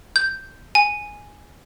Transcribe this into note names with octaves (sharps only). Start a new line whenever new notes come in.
G6
G#5